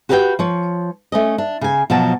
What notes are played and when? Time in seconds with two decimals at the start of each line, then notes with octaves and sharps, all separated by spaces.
0.09 F#4 G4 B4 C5 F5 G5
0.39 F3 C#5
1.12 A3 C#4 D#5
1.38 D4
1.61 C#3 G#5
1.90 B2 F3 F#3 A5